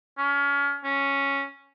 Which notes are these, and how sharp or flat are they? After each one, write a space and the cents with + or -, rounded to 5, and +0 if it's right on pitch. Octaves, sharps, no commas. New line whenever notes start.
C#4 +30
C#4 +0